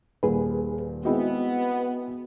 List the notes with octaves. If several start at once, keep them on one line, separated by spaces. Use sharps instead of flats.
D#1 A#2 G#4 B4
G#3 B3 C4 E4 F#4 D#5